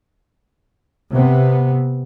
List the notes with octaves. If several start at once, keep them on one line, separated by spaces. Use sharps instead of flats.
C3 B3